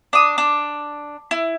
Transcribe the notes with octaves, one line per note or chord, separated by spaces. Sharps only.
D4 D#6
D4
E4